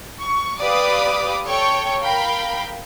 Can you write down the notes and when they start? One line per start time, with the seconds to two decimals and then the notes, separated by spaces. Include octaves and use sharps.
0.19 C#6
0.60 G4 B4 D5 F5 D6 D#6
1.45 A4 C#5 G5 C#6
2.02 A#4 F5 G5 B5